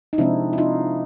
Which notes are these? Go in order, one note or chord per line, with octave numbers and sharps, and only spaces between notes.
D#4
C3 F3 G#3 C4 D4 E4
E4
D#4 F4